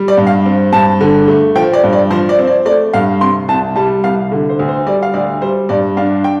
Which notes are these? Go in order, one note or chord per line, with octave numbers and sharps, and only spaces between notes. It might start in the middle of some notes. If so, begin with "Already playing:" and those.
Already playing: G3
D5
G2
F5
C4
G2 A5
D3
A3
F3 G5
D5
G2
D5
F3 C5
D5
C4
D5
A3 D5
G2 F5
C3 C6
C2 A5
G3 A5
C2 F5
D3
C5
D2
C5
G3 D5
F5
D2 D5
G3 C5
G2 D5
D4 F5
G5